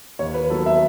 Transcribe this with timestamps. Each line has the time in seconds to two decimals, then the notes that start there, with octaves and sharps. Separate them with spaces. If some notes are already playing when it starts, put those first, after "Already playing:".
0.19 D#2 C#5
0.34 B4
0.50 D#3 F#3 B3 A4
0.66 E5